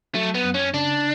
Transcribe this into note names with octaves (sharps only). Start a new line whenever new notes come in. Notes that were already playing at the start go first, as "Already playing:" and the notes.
F#3 A3
B3
F#2
C#4
C#3 D4